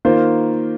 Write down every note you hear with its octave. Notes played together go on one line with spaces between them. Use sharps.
D#3 A#3 F4 C5